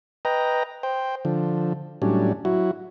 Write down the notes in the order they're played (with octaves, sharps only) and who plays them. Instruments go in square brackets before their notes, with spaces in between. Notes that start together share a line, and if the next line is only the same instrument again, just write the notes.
[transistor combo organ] B4 D#5 G5 A#5
C5 G5
D3 F3
A2 F#3 G3 C#4 D4
F#3 E4 F#4